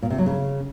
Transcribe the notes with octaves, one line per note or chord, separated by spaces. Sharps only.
A#2
C3
F#3
C#3